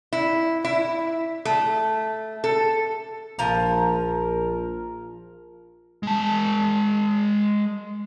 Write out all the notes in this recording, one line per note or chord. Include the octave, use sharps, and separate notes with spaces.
E4
E4
A3
A4
A#1 F3 A#4 A#5
G#3 A5